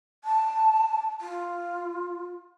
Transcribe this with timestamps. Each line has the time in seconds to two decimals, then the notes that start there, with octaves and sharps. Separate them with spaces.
0.24 A5
1.21 F4